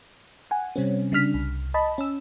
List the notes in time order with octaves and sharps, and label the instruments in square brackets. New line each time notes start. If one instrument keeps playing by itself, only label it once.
[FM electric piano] F#5 G#5
C3 G3 C4 C#4
C#3 G3 D4 F6 B6
C2
D#5 A5 B5
C#4 E6